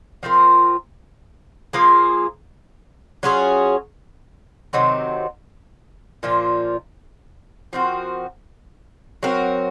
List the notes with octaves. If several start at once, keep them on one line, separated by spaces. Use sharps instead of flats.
F3 C4 F4 A#4
F3 A#3 F4 G#4
F#3 C#4 F4 G#4
C3 D#3 F#3 C4
A#2 F3 A#3 F4
F3 C4 F#4 A#4
F#3 C4 F#4 A#4